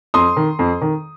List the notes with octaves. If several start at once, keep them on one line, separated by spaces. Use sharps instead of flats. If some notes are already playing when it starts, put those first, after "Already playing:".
F2 C6 D#6
D#3
F2
D#3